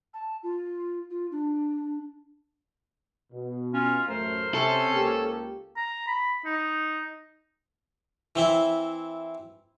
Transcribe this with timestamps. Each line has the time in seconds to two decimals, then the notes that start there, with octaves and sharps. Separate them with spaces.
0.14 A5
0.43 F4
1.10 F4
1.32 D4
3.32 B2
3.74 C#4 F4
4.08 A1 F#2 A3 A#4 C5
4.54 C3 C#4 A4
4.94 C#2 A#3 G4
5.77 A#5
6.08 B5
6.45 D#4
8.36 E3 C4 E4